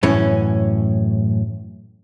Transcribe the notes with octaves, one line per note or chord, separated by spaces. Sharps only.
F#2 A2 E3 C#4